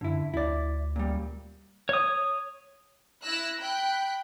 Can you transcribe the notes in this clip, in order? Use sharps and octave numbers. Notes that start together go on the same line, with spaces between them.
F#2 D3 E4
D2 E4 D5
A#2 G3
C#5 D#6
E4 E6 F#6 A#6
G5 B5 F#6